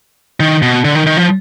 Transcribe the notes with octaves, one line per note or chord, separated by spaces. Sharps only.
D#3
B2
D3
D#3
D#3
F3